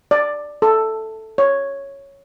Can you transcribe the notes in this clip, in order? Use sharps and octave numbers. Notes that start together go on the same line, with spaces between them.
D5
A4
C#5